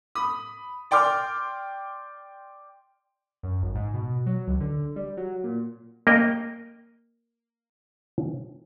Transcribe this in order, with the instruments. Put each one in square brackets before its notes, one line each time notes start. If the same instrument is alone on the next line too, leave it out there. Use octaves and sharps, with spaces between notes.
[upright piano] B5 D#6
D5 G5 C6 D6 F6
[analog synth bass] F#2
G#1
G#2
B2
F#3
C#2
D3
G3
F#3
A#2
[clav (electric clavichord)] A#3 A#4 D#5 G5